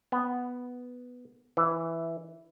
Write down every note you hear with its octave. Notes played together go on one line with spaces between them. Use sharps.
B3
E3